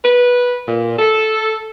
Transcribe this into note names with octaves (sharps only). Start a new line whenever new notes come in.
B4
A#2
A4